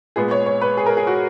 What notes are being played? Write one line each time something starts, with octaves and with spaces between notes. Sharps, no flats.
A#2 G#3 B3 G#4
C#5
C#5
B4
G#4
A#4
G#4
F#4